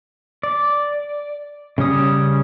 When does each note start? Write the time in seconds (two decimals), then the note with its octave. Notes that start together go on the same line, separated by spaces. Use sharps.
0.43 D5
1.78 C#3 G3 C#4 D#6